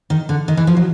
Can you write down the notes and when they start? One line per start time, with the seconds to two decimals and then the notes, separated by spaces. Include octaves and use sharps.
0.10 D#3
0.29 D3
0.48 D#3
0.57 E3
0.67 F3
0.77 F#3